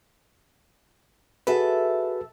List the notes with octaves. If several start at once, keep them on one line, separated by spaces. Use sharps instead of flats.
F#4 G#4 A4 B4 E5